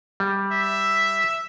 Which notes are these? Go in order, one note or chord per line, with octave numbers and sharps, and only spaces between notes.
G3
E5